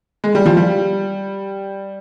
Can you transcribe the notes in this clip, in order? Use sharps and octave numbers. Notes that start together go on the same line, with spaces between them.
G#3
G3
F3
G3